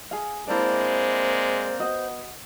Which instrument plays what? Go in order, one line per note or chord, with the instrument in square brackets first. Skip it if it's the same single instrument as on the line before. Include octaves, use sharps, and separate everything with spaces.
[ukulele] G#4 F5
[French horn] G#3 [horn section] A#3 C4 D5 [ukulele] D4 E4 [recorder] C5
[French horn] B3 [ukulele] F#4 D#5